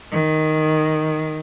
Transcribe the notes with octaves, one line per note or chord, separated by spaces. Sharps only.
D#3